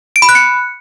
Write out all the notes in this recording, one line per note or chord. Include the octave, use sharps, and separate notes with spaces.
D7
B5
F#6
C#7